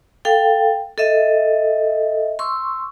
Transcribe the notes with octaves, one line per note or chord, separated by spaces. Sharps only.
A4 F5 G5
A4 D#5 E5
C6 C#6 E6